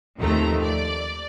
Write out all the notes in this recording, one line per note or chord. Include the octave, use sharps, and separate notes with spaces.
D#2 D#3 F3 A3 C4 A#5
D5